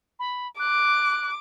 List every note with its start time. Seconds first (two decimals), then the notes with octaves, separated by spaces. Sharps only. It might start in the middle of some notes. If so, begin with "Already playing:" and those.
0.19 B5
0.59 D6 F#6